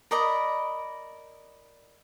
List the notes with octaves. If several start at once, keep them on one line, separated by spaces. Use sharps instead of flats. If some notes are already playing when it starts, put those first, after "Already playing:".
A#4 D5 D#5 B5